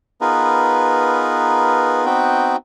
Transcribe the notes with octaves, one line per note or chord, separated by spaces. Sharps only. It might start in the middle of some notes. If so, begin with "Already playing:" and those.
B3 D#4 F4 G#4 A#4 B4
B3 C4 D#4 F#4 B4 G5